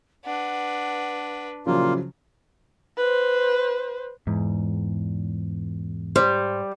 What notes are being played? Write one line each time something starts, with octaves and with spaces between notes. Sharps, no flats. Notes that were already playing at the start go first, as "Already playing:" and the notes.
D4 B4 F#5
A#2 C#3 F3 F#3 A#3 E4 F4
B4 C5
E2 G#2
G3 C5